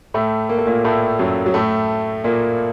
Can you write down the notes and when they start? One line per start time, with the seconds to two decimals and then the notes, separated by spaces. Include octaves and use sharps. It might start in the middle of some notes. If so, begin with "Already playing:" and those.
0.14 A2 A3
0.49 A#3
0.58 A3
0.67 A#2 A#3
0.84 A2 A3
1.19 F#2 F#3
1.46 F#3
1.54 A2 A3
2.24 A#2 A#3